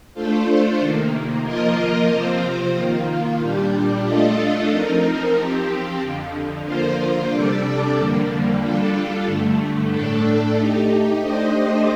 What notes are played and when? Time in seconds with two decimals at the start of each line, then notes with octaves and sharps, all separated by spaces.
0.14 A3 D4 F4 A4 C5
0.79 C3 D#3 A#3
1.44 F3 A#3 F4 A#4 D#5
2.10 C3 F3 C4 F4 C5
2.74 D#3 A#3 F4
3.39 A#2 G3 D4 G4
4.04 A3 D4 F4 A4 D#5
4.70 F3 C4 D#4 A#4
5.35 F3 C4 G4
6.00 F2 D3 F3
6.64 D3 F3 A#3 F4 C5
7.30 C3 G3 D4 A4 D5
7.95 F2 D3 G3 A#3
8.60 G3 D4 F4 A4
9.25 G2 D3 A3
9.90 A2 A3 D4 A4
10.55 A3 D#4 G4
11.20 A3 D4 G4 C5 D#5